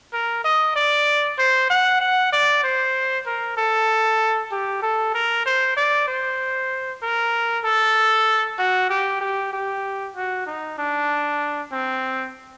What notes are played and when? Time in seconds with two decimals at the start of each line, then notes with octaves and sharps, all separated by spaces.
0.13 A#4
0.44 D#5
0.76 D5
1.38 C5
1.70 F#5
2.01 F#5
2.33 D5
2.63 C5
3.26 A#4
3.57 A4
4.51 G4
4.82 A4
5.14 A#4
5.46 C5
5.77 D5
6.08 C5
7.03 A#4
7.65 A4
8.59 F#4
8.90 G4
9.21 G4
9.53 G4
10.16 F#4
10.47 D#4
10.78 D4
11.72 C4